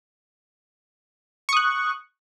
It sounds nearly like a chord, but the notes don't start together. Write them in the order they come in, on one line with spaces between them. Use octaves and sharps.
C#6 D#6 F#6